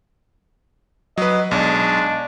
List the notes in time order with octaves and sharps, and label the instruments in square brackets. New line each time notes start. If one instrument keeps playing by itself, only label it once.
[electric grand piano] F#3 B4 [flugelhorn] D#5
[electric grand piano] B1 [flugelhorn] G#3 [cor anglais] D4